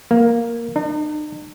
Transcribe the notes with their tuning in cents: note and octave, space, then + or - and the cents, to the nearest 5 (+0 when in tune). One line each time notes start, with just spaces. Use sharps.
A#3 +5
D#4 -45